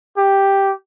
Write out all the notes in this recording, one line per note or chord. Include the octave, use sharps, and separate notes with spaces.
G4